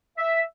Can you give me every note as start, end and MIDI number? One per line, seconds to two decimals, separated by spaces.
0.18 0.41 76